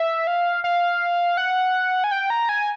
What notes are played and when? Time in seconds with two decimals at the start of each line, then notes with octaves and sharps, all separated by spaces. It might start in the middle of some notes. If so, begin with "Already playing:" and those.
Already playing: E5
0.27 F5
0.64 F5
1.37 F#5
2.04 G#5
2.11 G5
2.30 A#5
2.49 G#5